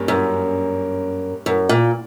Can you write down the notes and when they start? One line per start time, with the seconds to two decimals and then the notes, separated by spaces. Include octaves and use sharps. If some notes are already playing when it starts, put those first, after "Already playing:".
Already playing: G2 A#3 C#4
0.08 F#2
1.46 F#2
1.69 A#2